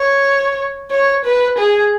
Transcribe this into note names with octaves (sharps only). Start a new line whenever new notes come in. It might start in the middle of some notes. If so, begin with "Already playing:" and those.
Already playing: C#5
C#5
B4
G#4